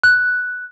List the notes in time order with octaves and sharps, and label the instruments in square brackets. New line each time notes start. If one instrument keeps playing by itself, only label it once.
[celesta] F#6